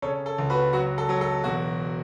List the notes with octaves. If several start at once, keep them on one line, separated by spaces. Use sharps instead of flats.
C#3 A4 C#5
A4
C#2
F#4 B4
F#3 F#4
A4
F#3
A4
E1 F#4